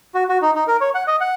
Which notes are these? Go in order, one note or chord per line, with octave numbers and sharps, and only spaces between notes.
F#4
F#4
D#4
D#4
A#4
C#5
F#5
D#5
F#5